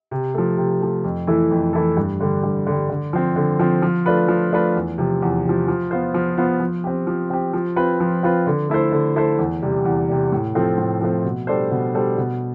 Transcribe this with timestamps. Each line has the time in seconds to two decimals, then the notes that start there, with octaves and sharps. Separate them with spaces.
0.11 C3
0.34 F3 A3
0.57 C3
0.81 F3 A3
1.04 F2
1.27 E3 A3 E4 A4
1.51 F2
1.73 E3 A3 E4 A4
1.97 G2
2.20 D3 G3
2.44 G2
2.67 D3 G3
2.90 D3
3.13 F3 C4
3.36 D3
3.59 F3 C4
3.82 F3
4.06 A3 D4 F4 B4
4.28 F3
4.52 A3 D4 F4 B4
4.76 E2
4.98 C3 F3
5.22 E2
5.44 C3 F3
5.68 F3
5.91 B3 F4 C5
6.14 F3
6.38 B3 F4 C5
6.60 F3
6.84 C4 G4
7.07 F3
7.30 C4 G4
7.54 F3
7.76 C4 F4 B4
8.00 F3
8.23 C4 F4 B4
8.47 D3
8.69 A3 E4 A4 C5
8.92 D3
9.16 A3 E4 A4 C5
9.38 E2
9.62 C3 G3
9.85 E2
10.09 C3 G3
10.32 A2
10.55 F3 A3 C4
10.78 A2
11.01 F3 A3 C4
11.25 B2
11.47 G3 D4 A4 C5
11.71 B2
11.95 G3 D4 A4 C5
12.17 B2